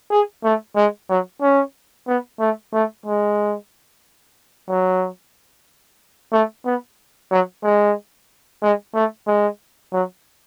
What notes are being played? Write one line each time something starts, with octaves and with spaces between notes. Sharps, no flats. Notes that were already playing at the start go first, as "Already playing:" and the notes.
G#4
A3
G#3
F#3
C#4
B3
A3
A3
G#3
F#3
A3
B3
F#3
G#3
G#3
A3
G#3
F#3